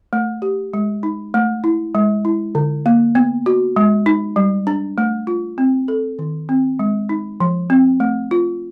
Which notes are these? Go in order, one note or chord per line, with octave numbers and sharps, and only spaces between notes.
A3
G4
G#3
D#4
A3
E4
G#3
E4
D3
A#3
B3
F#4
G#3
D#4
G3
D4
A3
F4
C4
A4
D#3
C4
G#3
D#4
F3
C4
A3
F4